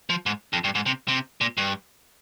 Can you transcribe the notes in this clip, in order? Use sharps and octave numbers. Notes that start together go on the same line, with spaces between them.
F3
G#2
F2
G2
G#2
C3
C3
A#2
G2